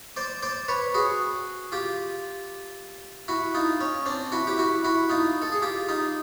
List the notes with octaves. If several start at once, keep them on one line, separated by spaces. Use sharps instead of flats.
C5 D5
C5 D5
B4 C#5
F#4 G#4
F4 G4
E4 F#4
D#4 F4
C#4
C4 D4
E4 F#4
G4
E4 F#4
E4 F#4
D#4 F4
A4
G#4
F4 G4
D#4 F4